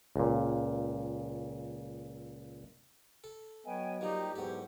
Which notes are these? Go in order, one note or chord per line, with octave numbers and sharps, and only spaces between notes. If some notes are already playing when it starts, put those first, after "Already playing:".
C#2 A#2
A4
F#3 B3 C#5 D#5 G5 G#5
F3 G3 A#3 D#4 G4
E2 G#2 F#3 B3 A4